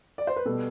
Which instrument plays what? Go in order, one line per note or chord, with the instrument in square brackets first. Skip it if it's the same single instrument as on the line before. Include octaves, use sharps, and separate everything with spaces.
[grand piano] D5
C5
B4
B2 G3 B3 A4